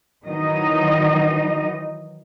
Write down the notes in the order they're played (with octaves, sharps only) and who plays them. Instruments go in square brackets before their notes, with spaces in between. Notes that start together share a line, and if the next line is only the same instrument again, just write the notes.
[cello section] D#3 E3 F#3 D#4 D#5